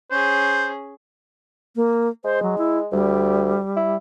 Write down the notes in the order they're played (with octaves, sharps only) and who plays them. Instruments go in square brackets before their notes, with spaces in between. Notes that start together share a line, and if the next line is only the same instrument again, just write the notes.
[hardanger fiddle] C#4 G#4 [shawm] C5
[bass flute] A#3
[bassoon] G#3 [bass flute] C5
[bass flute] F#3
E4
[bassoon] D2 [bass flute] G3
[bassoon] E4